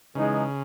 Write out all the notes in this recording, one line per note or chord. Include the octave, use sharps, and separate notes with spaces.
C#3 E3 G#3 D#4